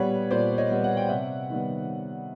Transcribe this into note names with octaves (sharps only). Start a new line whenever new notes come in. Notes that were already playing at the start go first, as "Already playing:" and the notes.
Already playing: A#2 G3 B3 G4 B4 C#5
A#2 C5 D5
C#5 D#5
G3 B3
F#5
G5
C3 E5 F#5
D#3 G3 B3